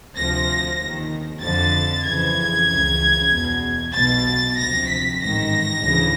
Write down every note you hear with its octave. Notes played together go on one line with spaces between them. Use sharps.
D2 C3 F3 A#6
D#2 D#3
F2 D3 F3 A6
F2 C#3 E3 G#6
C#2 C#3 E3
E2 B2
B1 B2 A6
D2 C3 F3 A#6
B6
A1 G#2 D#3 A#6
D2 C#3 E3